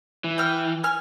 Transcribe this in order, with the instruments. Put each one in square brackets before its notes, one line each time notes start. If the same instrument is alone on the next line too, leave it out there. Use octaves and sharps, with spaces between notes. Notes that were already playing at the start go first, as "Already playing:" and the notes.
[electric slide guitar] E3
[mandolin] G5 F6
G#5 F6